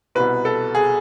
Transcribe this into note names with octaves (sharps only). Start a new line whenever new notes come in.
C2 B2 B4
A4
G#4